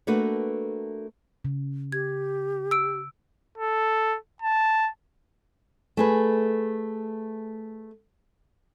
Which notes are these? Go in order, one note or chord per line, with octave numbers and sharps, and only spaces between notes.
A3 A#3 D4 F#4 A4 B4
C#3
G4 G#6
E6 D7
A4
A5
A3 G#4 B4